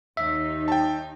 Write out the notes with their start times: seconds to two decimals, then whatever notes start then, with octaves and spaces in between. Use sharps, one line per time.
0.17 D#2 D#4 E5
0.68 G5 A5